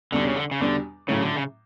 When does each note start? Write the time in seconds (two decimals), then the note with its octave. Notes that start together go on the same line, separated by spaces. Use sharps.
0.12 E2 B2 D3 G3 D4
0.25 C#3
0.36 D3
0.51 C#3
0.60 E2 B2 D3 G3 D4
1.08 A2 C#3 F#3 A3 C#4
1.21 D3
1.36 C#3